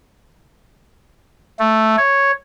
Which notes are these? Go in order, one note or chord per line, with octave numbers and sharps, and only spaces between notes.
A3
C#5